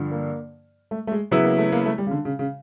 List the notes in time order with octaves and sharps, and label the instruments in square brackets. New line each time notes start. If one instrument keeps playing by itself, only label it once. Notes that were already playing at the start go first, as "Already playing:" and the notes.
Already playing: [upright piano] G2 D3 F3
[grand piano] A#3
A3
A3
G#3
[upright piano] C#3 F#3 B3 E4
[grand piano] A#3
A3
A#3
A3
G3
C#3
D3
C#3
C#3